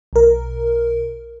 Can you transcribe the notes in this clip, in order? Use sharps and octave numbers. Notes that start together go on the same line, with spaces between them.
B1 A#4